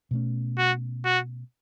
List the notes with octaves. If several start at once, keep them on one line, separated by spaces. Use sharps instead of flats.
B2 A3 C#4
F#4
F#4